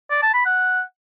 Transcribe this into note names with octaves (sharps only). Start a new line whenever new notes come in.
D5
A5
B5
F#5